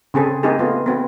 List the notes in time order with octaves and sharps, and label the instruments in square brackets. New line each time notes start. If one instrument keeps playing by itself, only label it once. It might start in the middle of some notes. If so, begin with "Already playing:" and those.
[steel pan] C#3 C4 G#4 A4
A#3 C4 D#4 G4 G#4
A3 B3 F4
B3 C4 F#4